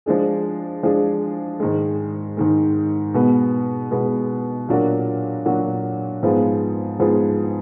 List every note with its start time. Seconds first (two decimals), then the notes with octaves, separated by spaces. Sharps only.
0.06 F3 G#3 D4 G#4
0.83 F3 G#3 D4 G#4
1.60 G#2 D#3 G#3
2.37 G#2 D#3 G#3
3.14 B2 G#3 B3
3.91 B2 G#3 B3
4.68 A#2 F#3 D4 F#4 A#4
5.45 A#2 F#3 D4 F#4 A#4
6.23 G#2 F3 B3 F4 G#4
6.99 G#2 F3 B3 F4 G#4